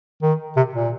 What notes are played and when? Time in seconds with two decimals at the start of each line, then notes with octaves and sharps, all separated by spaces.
0.22 D#3
0.56 C3
0.74 A#2